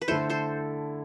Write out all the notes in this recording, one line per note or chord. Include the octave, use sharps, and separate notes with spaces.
B4
D3 A3 E4 A4 C5
A4 C5